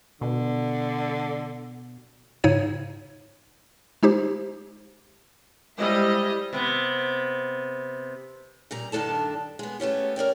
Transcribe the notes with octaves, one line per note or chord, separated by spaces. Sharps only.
B2 D3
G#2 C#3 D#4 C#5 G#6 D#7
G#3 D#4 G4 C5
G3 G#3 E4 C5 D#5 E6
C3 B3
A#2 G3 A#5
G2 D#3 D4 A4 A5
G#3 B3
A3 B3 C#4 G4
A#4 C#5 D5 G5